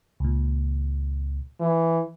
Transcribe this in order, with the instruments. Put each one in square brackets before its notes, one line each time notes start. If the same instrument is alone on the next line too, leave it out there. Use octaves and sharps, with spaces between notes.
[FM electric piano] C#2 A#2
[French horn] E3